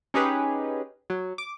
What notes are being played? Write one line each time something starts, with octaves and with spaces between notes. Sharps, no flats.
C#4 D#4 G4 G#4 B4
F#3
D6